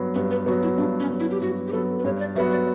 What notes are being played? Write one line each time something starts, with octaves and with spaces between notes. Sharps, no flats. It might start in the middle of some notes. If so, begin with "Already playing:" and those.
Already playing: G2 F#3 B3
G2 B4
B4
F#3 B3 F#4
E4
G2 D4
C#4
F#3 B3
E4
G4
G2 F#4
G4
F#3 B3 A4
B4
G2 C#5
D5
F#3 B3 F#4 E5
D5